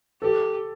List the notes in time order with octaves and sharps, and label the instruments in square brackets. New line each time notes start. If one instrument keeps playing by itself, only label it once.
[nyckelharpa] G4 [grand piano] A4